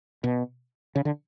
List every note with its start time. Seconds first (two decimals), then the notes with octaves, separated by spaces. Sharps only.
0.24 B2
0.95 C#3
1.05 D3